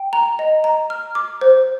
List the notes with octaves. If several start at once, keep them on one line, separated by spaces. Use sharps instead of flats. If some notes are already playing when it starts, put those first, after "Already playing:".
Already playing: G5
A#5
D#5
A#5
F6
D6
C5